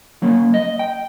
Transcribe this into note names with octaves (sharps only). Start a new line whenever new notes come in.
F#3 A#3 C#4
D#5
G5